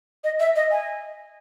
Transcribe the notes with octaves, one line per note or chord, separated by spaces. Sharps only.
D#5
E5
D#5
G#5